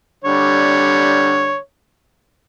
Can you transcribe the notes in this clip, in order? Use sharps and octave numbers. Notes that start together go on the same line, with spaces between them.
D3 G3 C#5